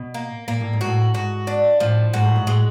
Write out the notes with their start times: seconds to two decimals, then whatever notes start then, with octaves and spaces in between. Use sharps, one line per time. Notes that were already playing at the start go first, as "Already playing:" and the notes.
Already playing: B2
0.14 A#3
0.48 A#2 A#3
0.60 A2
0.73 G#2
0.81 F#4
0.86 A2
1.14 G#2 F#4
1.47 D4
1.80 A2 F3
2.13 G#2 F#4
2.24 A2
2.36 G#2
2.47 A2 G#3